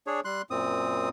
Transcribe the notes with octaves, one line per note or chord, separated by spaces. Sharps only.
D4 G#4 C#5
G3 C6 F#6
F#2 A#2 C4 D#6